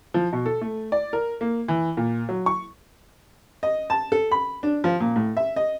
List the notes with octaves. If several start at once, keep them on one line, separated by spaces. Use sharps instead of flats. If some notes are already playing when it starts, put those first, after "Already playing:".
F3
B2
A4
A3
D5
A#4
A#3
E3
A#2
F#3
C#6
D#5
A5
A4
B5
D4
F3
A#2
A2
E5
D#5